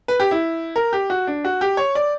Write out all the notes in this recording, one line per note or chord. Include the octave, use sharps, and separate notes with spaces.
B4
G4
E4
A#4
G4
F#4
D4
F#4
G4
C#5
D5